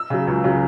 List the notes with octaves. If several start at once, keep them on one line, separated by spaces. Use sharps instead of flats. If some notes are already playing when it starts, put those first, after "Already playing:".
Already playing: E6
C#3 F#3
C#2
C#3 F#3